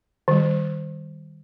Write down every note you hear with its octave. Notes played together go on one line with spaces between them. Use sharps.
D#3 G3